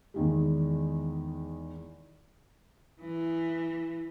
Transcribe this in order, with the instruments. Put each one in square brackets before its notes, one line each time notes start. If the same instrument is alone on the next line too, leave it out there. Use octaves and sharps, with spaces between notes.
[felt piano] E2 D#3 G#3
[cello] E3